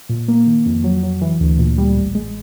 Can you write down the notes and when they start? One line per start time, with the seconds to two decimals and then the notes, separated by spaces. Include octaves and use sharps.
0.09 A#2
0.28 A#3
0.46 D#3
0.66 F2
0.84 F#3
1.03 F#3
1.21 E3
1.40 D2
1.58 A#2
1.78 G3
1.97 A1
2.15 G#3